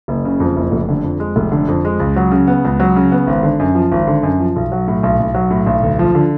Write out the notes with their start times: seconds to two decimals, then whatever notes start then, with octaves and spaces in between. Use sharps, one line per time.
0.08 F#1
0.25 C#3
0.40 F2
0.56 F#1
0.72 F1
0.89 D3
1.04 F2
1.20 G#3
1.36 F1
1.52 D3
1.68 F2
1.85 G#3
2.00 C#2
2.16 F#3
2.31 C#3
2.47 B3
2.64 C#2
2.80 F#3
2.96 C#3
3.12 B3
3.27 G#1
3.43 D3
3.59 F#2
3.75 F3
3.92 G#1
4.07 D3
4.23 F#2
4.40 F3
4.56 B1
4.72 F#3
4.88 A2
5.03 B1
5.20 B1
5.35 F#3
5.51 A2
5.66 B1
5.83 D2
5.99 F3
6.15 D3